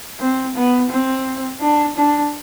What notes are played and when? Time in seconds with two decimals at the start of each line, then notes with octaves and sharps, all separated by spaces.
0.20 C4
0.55 B3
0.90 C4
1.60 D4
1.96 D4